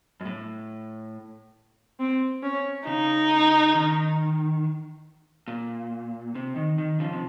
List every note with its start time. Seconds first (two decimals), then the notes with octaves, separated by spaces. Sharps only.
0.21 F#2
0.25 A2
2.00 C4
2.43 C#4
2.87 C#3 D#4
3.74 D#3
5.48 A#2
6.35 C3
6.56 D#3
6.78 D#3
7.00 C#3 F3
7.13 C3